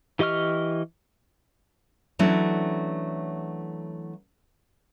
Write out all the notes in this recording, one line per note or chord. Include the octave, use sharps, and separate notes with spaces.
E3 G4 D#5 C#6 F6
E3 F#3 A3 C#4 D4 E4